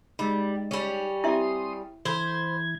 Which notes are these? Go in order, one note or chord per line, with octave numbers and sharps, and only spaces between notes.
G3 G#3 D#4
G3 C#4
C4 E4 G4 E5 C6 D#6
E3 A4 C5 B5 G6 G#6